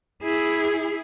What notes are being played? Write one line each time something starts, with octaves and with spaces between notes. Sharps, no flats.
E4 G#4